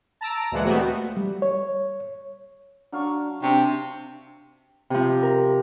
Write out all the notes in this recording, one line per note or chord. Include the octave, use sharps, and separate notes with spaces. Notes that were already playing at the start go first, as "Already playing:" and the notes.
A5 A#5 E6 D7
A#5
D2 A#2 E3 G#3 F#5
A#2 G3 A3 B3 C4 F#4
G3
C#5
F#3 D4 F5 C#6
C3 D4 C5 E5 G5 C#6
C3 F3
A#4